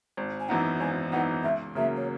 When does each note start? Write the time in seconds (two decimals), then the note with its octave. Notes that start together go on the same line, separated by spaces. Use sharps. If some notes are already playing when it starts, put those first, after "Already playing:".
0.17 G#1
0.39 G#5
0.48 F#2 E3 B3 D#4 F#5
0.80 G#1 G#5
1.12 F#2 E3 B3 D#4 F#5
1.43 C#2 E5
1.75 C#3 F#3 A#3 E5
1.96 C#5